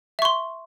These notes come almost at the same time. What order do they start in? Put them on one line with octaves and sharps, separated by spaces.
E5 C#6 C6